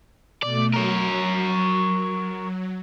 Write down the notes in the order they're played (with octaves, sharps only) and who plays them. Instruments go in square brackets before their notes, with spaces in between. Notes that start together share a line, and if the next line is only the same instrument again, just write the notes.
[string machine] B2 A3 [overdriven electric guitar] D5
[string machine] F#3 [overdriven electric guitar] A#4 C#5